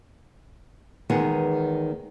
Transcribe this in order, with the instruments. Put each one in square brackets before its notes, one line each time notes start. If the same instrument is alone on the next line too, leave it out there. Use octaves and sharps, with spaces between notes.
[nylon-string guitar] E2 D#3 G#3 B3 G#4 F#5